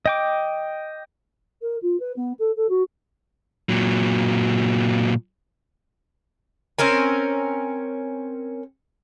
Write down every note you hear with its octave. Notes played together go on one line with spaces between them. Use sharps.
D#5 G5 D6
A#4
F4
B4
B3
A4
A4
F#4
A#2 F#3
C4 C#4 A#4 G#5